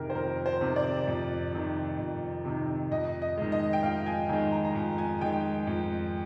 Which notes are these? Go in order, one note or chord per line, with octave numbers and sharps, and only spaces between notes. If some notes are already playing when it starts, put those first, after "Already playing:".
Already playing: F2 C3 D#3 G#4 A#4
C5
F2 A#4
C5
C3 D#3
D5
F2
C3 D#3
F2
C3 D#3
F2 D#5
D#5
D#3 G#3
D#5
G5
F2 F5
G#5
D#3 G#3 G#5
A#5
A#5
F2 G#5
G#5
D#3 G#3 G5
F2